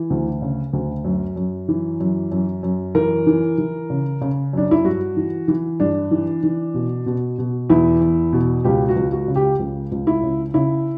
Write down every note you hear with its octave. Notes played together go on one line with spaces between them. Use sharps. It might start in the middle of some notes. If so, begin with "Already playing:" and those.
Already playing: E3
D2
C#3
D2
F#2
F#2
E3
F#2
F#2
F#2
E3 A#4
E3
E3
C#3
C#3
F#2 D4
E4
G2 F#4
E3
E3
G2 D4
E3
E3
B2
B2
B2
E2 E4
E2
B2
C#2 G4
F#4
C#2
F#4
C#3
G4
C#2
C#2
E4
C#3
C#3 E4